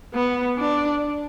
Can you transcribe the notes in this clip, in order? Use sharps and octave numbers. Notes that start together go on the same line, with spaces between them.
B3
D4